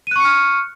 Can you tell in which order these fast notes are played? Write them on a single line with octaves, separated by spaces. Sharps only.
D#7 F#6 C#6 C#7 F6